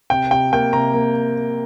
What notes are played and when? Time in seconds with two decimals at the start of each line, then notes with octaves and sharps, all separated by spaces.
0.10 C3 G5
0.31 C3 G5
0.53 A#3 G5
0.73 C3 A#5
0.94 A#3